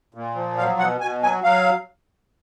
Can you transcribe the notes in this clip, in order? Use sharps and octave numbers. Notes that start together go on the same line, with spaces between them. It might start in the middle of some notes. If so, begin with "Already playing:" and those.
A#2
F3
F#3 F5
B2 F#5
B2 G#5
F#3 G#5
F#3 F5